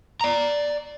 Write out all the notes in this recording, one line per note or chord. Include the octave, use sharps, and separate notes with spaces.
D5 A#5